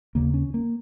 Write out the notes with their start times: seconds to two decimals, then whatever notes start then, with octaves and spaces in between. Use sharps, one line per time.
0.15 D#2 C#3 A#3
0.34 C#4
0.54 A#3